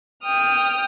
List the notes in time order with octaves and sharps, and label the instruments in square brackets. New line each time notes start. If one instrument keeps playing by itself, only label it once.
[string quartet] G5 D#6 F6